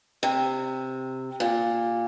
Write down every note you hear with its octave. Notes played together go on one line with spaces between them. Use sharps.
C3
A#2